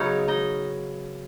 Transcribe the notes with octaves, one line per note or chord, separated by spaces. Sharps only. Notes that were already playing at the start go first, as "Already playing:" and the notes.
Already playing: C#3 F#3 B3 C#4 D#4 C#5
D#4 D#5